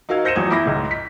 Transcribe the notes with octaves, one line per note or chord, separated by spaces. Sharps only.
D#4 F#4 A#4 F5 E6 G#6
C5 G6 A#6 C#7 D#7 E7
E2 F3 F#3 D#6 G#6
E4 B5 D6 A#6
C#2 G#2
B6